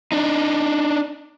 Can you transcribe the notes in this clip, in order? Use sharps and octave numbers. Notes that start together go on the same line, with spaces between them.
D4 D#4